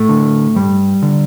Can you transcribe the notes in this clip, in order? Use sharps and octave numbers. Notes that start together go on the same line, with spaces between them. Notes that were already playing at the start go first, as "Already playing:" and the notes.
Already playing: A2 A3
D3
G2 G3
D3